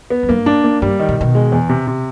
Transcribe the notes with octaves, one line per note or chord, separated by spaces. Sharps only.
B3
F#2
G2 A#3
D4
A#3
G2 G3
D#3
A#2
B2 D#3
G#3
E2
C3
C3